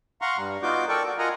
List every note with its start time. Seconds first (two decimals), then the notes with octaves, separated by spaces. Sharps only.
0.22 F5 F#5 A#5 C6 C#6
0.37 G2 G3
0.63 B3 D#4 F4 F#4 D6 G6
0.88 A4 A#4 D5 G5 C#6
1.06 F#4
1.19 F4 A#4 D#5 F#5 G#5 A#5